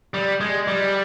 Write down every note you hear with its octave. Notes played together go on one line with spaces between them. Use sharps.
G3
G#3
G3